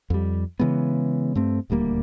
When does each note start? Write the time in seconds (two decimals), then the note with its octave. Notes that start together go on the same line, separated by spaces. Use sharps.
0.10 F2 G3
0.60 C#3 E3 G#3 B3
1.35 G2 A3 C4
1.70 D#1 D2 G3 A#3